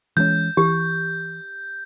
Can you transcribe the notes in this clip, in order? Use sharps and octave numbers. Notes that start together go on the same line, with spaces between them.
E3 G#3 C#4 G6
E3 G4